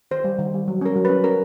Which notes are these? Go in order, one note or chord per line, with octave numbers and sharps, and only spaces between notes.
D#3 C5
G3
D#3
G3
F#3
C#4 A#4
F#3
C#4 B4
C#4 A#4